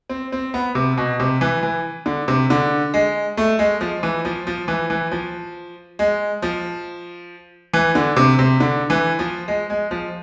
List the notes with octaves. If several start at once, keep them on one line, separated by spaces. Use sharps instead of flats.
C4
C4
B3
C3
B2
C3
E3
E3
D3
C3
D3
G#3
A3
G#3
F3
E3
F3
F3
E3
E3
F3
G#3
F3
E3
D3
C3
C3
D3
E3
F3
G#3
G#3
F3